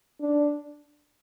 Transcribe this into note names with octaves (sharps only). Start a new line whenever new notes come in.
D4